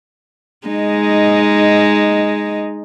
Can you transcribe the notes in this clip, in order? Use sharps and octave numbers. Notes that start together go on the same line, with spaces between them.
G#3 D#4